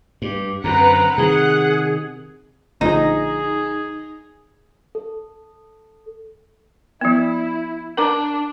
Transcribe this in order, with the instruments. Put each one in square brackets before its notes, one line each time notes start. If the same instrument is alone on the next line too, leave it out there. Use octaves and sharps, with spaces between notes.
[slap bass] G2 [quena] G4
[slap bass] F#2 D3 [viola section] C4 B4 F#5 [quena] A#5
[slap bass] C3 D#3 [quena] G#4 [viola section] F#5
[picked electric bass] A#1 D3 F3 [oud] D#4 [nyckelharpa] G#4
[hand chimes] A4
[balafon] F3 B3 [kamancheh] E4
[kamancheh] D4 [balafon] A#4 A#5 D6